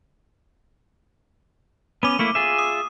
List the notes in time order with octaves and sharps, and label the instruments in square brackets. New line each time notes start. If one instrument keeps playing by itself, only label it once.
[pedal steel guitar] B3 C#4 [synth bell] D6 D#7
[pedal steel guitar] A3 A#3 E4
F4 G#4 E5
[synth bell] D#6